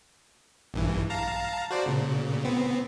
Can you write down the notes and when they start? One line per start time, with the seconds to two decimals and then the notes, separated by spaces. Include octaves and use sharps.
0.74 A#1 G2 E3
1.10 F5 A5 A#5
1.71 F#4 C5 D5
1.86 A#2 C#3
2.45 B3 C4